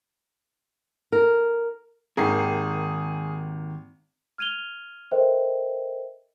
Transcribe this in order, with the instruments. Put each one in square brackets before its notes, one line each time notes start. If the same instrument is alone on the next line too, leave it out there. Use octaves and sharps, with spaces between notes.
[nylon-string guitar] A#4
[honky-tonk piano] G#1 D#3 C7 [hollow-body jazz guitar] D#2 A#4 [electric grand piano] G#4
[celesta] F6 G#6 D#7 F7 G7
A4 A#4 C5 D#5 E5 G5